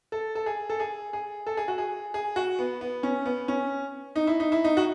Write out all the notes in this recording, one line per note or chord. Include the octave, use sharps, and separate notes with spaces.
A4
A4
G#4
A4
G#4
G#4
A4
G#4
F#4
G#4
G#4
F#4
B3
B3
C#4
B3
C#4
D#4
E4
D#4
E4
D#4
F#4